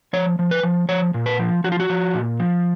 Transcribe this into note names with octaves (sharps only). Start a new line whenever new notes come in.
F3 C#5
F3
B4
F3
F3 C#5
A#2
B4
F3
F3 F#4
F4
F#4
F3
A#2
F3